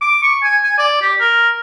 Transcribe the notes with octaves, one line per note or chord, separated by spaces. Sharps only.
D6
C#6
G#5
G#5
D5
G4
A#4